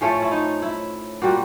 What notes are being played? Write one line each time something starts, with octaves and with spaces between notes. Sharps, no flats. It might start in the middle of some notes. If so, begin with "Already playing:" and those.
A2 F3 A3 C#4
E4
D#4
E4
A#2 G3 A#3 F#4